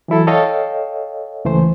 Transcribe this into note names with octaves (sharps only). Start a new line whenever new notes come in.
E3 F#3 E4 A4
A4 C#5 D#5 F5 G5
C#2 E3 A3 C5